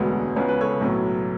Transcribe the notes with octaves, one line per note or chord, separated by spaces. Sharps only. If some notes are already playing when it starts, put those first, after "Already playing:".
Already playing: E1 D2 D3 G#3 B3 A4 C#5
C#2 C#3 G#3 B3 C#5
B4
A4 C#5
B1 A2 F#3 B3